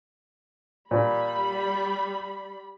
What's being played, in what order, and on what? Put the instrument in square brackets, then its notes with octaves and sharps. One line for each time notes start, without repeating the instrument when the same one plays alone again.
[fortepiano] A#2 [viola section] G3 B5